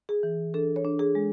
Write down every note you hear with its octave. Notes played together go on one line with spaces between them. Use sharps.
G#4
E3
D4 A4
C#5
D4
G#4
G#3